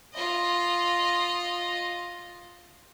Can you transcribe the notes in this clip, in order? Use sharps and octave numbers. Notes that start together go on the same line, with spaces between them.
F4 D#5